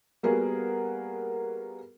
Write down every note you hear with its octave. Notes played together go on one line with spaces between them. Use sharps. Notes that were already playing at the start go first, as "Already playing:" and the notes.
G3 A#3 B3 F#4 G#4